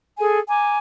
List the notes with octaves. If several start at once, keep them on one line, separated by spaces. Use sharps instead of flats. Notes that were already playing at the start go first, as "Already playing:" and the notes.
G#4 A4 G#5
G#5 A#5 D6